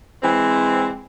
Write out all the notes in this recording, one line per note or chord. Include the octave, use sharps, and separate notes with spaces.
E3 G#3 C4